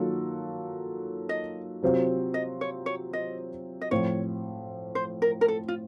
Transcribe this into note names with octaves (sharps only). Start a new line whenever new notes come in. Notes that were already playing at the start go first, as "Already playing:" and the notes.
Already playing: D#3 F#3 A#3 F4 A4
D#5
C3 F#3 C4 F4 C5
D#5
C#5
C#5
D#5
D#5
A2 F3 C4 C#5
C5
A#4
A#4
A4
F4